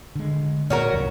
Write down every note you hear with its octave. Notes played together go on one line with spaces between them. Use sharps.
D3 G#3
A#2 C#4 F#4 A#4
C2 F#2 E3